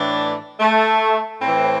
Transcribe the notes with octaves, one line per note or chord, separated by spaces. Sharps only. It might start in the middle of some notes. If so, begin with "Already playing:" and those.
Already playing: A2 E3 D4
A3
A2 E3 C4